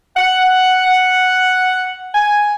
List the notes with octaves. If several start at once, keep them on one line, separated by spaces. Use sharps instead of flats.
F#5
G#5